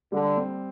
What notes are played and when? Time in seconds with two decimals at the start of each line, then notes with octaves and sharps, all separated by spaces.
0.12 D3 G3
0.37 C4